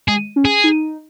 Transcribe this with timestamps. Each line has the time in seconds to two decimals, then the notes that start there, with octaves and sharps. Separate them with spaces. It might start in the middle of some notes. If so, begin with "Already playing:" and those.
0.08 G#3 G#4
0.36 C#4
0.45 G#4
0.64 D#4